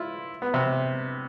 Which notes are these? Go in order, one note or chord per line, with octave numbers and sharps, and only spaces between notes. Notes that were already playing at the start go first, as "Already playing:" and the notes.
Already playing: E4 F4
B3
C3